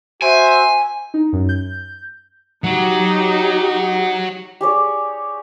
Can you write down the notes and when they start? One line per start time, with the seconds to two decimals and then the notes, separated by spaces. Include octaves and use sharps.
0.22 F#4 C5 E5 G#5
1.14 D#4
1.33 F#2
1.49 G6
2.64 F#3 D#4 F#4 G4
4.61 G4 G#4 C#5 D5